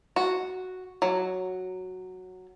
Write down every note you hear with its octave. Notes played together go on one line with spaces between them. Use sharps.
F#4
F#3